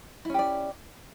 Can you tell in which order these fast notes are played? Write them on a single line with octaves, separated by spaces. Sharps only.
E4 C#4 G4 D5